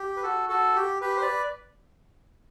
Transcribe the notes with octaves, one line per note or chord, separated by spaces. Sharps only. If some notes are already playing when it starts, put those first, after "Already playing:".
Already playing: G4
B4
F#4 A4
F#4 A4
G4
G4 B4
C5
B4 D5